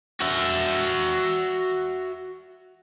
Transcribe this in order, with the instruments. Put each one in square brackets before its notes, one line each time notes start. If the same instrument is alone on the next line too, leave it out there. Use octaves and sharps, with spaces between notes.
[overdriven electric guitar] F#4 E5